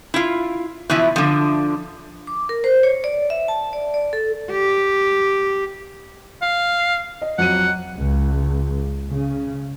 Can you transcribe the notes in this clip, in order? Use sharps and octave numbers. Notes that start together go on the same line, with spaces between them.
E4 F4
B2 E3 F3 E4
D3 F3
D6
A#4
C5
C#5
D5
E5
A5
D5
D5
A4
G4
F5
D#5
F2 F#3 F#5 D#7
C#2
C#3